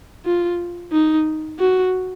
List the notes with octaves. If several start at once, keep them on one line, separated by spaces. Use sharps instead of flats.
F4
D#4
F#4